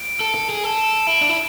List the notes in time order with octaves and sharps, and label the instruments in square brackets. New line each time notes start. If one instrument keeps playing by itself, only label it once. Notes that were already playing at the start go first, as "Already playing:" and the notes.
Already playing: [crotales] D7
[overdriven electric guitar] A4
A4
G#4
A4
[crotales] E7
[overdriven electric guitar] E4 [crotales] D7
[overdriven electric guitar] D4
E4